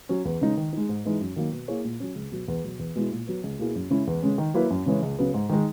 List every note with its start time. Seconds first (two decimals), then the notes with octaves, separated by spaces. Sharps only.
0.09 F#3 C#4
0.25 E2
0.41 C#3 G#3 D#4
0.57 D#3
0.73 G#3 D#4
0.89 G#2
1.05 E3 G#3 D#4
1.21 F#2
1.36 D#3 F#3 A#3
1.52 B2
1.68 A#3 E4 G#4 C#5
1.84 A#2
2.00 F#3 C#4
2.15 C#2
2.32 B2 F#3
2.48 E2
2.64 B2 F#3
2.79 E2
2.96 B2 G#3 B3 E4
3.11 A#2
3.27 F#3 B3
3.43 C#2
3.59 B2 A#3 E4 G#4
3.75 F#2
3.90 C#3 G#3 C#4 E4
4.07 E2
4.22 C#3 G#3 C#4
4.38 D#3
4.54 F#3 A#3 E4 B4
4.70 F#2
4.86 C#3 E3 G#3 C#4
5.02 C#2
5.19 C#3 F#3 B3
5.34 G#2
5.49 D#3 G#3 D#4